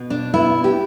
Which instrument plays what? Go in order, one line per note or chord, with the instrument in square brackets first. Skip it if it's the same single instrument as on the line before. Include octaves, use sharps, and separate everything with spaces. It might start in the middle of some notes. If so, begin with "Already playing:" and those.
Already playing: [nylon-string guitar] B2
D4
B3 E4
G4